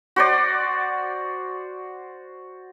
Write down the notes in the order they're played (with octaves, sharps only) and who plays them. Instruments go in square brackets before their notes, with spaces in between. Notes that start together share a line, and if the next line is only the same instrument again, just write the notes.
[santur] F#4 C5 D5